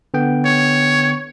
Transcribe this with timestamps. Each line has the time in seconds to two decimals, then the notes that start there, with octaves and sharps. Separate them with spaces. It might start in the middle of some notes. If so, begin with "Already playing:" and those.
0.14 D3 B3 G5
0.45 C#5